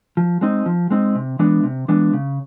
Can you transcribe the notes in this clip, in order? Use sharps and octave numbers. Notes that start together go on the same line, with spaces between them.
F3
G#3 C4 D#4
F3
G#3 C4 D#4
C3
E3 G#3 B3 D4
C3
E3 G#3 B3 D4
C#3